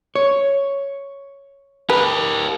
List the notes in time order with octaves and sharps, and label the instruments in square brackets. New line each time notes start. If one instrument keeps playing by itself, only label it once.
[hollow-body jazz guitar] C#5
[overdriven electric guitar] G4 A#4 [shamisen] B4